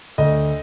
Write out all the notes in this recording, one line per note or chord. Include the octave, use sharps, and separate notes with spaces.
D2 D#5